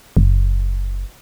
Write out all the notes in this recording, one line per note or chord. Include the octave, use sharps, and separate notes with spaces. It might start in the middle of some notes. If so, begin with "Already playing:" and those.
F#1